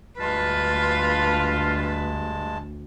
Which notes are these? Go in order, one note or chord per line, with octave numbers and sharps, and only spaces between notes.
D2 G2 G#3 D4 F4 B4 A5